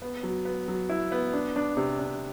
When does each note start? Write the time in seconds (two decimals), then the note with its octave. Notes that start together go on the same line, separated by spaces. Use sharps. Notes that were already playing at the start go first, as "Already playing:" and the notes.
0.02 B3
0.23 F#3
0.45 B3
0.68 F#3
0.89 E4
1.12 B3
1.33 D4
1.56 D4
1.77 C3
1.99 D4